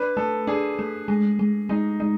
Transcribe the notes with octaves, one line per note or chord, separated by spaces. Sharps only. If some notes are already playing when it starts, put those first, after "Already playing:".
Already playing: D4 B4
A3 A4
D4 G#4
A3
G#3
G#3
G#3 D#4
G#3 D#4